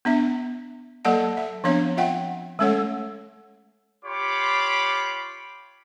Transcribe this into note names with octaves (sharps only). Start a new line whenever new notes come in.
B3 D4 E5
F#3 A#3 A4 D5 F#5 A5
E5
F3 B3 C4 D4 C#5 F5
F4 E5 F#5 G5
G#3 A3 C#4 A4 C#5 F#5
F4 G4 C#5 B5 C6 D6